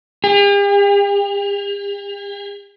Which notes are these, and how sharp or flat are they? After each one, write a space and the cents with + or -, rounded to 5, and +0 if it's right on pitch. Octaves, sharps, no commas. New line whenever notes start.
G4 +45